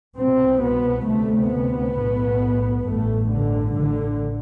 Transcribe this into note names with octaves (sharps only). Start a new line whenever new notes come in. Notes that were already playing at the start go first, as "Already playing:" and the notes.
C2 B2 C4
B3
D2 C3 A3
B3
B1 A2
A1 G2 A3
D3
A1 A2 D3